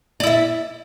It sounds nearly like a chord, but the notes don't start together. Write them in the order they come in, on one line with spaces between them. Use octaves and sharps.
D5 E4 E5